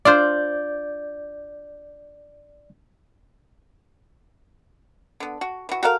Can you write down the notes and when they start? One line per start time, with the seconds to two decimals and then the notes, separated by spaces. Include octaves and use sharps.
0.05 D4 F4 C5 D5 G6
5.20 D3 B3
5.41 F#4
5.69 E3 F#4
5.83 F#4 A4 A#4 F5